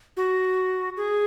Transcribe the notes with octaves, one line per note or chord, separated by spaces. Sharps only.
F#4
G#4